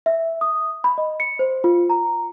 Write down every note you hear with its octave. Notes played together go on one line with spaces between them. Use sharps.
E5
D#6
B5
D#5
C#7
C5
F4
A#5